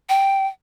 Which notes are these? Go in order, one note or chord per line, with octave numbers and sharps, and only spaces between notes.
G5